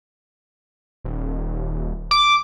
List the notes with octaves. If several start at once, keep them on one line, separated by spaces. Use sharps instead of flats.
D#1
D6